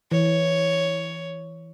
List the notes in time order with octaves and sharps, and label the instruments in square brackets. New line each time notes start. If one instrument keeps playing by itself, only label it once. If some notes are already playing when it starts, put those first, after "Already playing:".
[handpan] E3 [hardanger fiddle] C#5